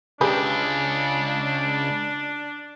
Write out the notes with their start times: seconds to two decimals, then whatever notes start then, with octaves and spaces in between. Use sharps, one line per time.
0.21 C#2 C#3 D4 G4 G#4 B4